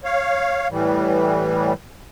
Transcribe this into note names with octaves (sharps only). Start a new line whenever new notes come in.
C#5 F5
A2 E3 G3